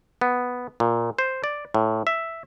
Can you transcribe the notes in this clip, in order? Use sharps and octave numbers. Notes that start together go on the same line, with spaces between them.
B3
A#2
C5
D5
A2
E5